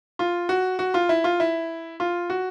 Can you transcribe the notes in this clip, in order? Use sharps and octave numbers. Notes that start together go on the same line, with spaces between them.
F4
F#4
F#4
F4
E4
F4
E4
F4
F#4